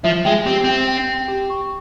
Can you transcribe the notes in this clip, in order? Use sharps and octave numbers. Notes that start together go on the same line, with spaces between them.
F3 E5
G#3 G5
C4 G4
C4 G5
G5
G5
G4
C#6